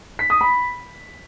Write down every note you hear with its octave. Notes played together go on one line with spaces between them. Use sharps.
B6
D#6
B5